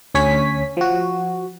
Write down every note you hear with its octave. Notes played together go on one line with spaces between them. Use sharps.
D2 C#4 C#5 G#5 B6
F3 F#4